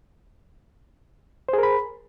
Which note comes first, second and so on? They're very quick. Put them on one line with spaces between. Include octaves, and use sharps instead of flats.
C5 G#4 A#4 B5